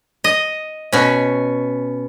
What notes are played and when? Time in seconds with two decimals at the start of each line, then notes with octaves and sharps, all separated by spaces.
0.24 D#5
0.93 B2 C#4